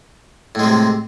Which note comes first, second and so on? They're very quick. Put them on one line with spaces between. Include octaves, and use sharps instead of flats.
A2 G#3 C3